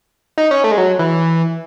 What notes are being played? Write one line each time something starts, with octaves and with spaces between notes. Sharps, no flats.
D#4
C#4
A3
G#3
F#3
E3